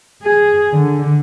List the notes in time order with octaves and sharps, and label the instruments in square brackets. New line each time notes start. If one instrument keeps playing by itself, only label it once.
[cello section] G#4
D3